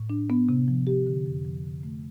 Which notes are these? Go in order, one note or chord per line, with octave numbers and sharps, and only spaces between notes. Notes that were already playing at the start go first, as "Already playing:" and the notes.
Already playing: A2
D4
B3
C3
F3
G4
D3
F2
F3
D3
A3